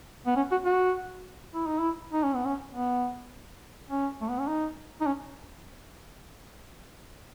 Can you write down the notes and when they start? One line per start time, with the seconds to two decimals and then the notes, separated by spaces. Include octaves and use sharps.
0.26 B3
0.36 C#4
0.51 F#4
0.65 F#4
1.54 E4
1.67 D#4
1.79 E4
2.13 D#4
2.24 C#4
2.35 B3
2.46 C#4
2.72 B3
3.89 C#4
4.21 A3
4.30 B3
4.39 C#4
4.48 D#4
5.01 D#4
5.07 C#4